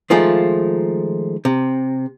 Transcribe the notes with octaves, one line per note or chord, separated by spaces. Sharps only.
D#3 F3 G#3 A3 F4
C3